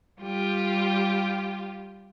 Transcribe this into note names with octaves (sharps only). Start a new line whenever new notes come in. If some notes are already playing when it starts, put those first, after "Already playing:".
G3 F4 G4